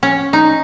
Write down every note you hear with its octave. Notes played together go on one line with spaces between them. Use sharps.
C#4
D#4